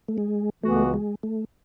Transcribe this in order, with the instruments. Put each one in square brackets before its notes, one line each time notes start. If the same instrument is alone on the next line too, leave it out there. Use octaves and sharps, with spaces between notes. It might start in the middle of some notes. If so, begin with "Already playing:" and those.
[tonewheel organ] A3
G#3
[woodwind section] C#2 C#3 E3 B3 F#4 [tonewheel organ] A3
[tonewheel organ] G#3
A3